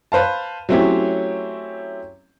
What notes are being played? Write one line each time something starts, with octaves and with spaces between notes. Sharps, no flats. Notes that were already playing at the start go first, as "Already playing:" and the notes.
B4 C5 F5 A5
F#3 A3 C4 C#4 E4 G4